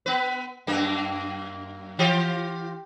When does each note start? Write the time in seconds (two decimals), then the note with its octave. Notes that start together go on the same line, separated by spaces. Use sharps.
0.06 B3 B4
0.67 F#2 A#3
1.99 E3 F4 G4